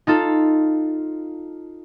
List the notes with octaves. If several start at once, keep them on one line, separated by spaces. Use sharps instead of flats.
D#4 F4 A4